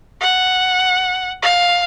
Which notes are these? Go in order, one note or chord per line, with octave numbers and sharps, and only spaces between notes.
F#5
F5